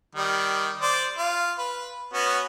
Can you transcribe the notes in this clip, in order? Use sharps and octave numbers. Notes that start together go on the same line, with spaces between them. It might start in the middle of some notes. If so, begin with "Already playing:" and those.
D#3 G3
C5 D5
F4
B4
B3 C#4 F#4